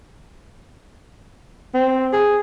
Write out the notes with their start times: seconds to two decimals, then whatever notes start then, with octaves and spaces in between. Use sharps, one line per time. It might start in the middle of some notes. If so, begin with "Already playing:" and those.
1.74 C4
2.13 G#4